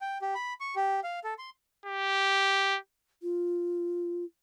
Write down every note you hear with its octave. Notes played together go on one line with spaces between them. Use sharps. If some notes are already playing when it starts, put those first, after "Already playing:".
G5
G4
B5
C#6
G4
F5
A4
C6
G4
F4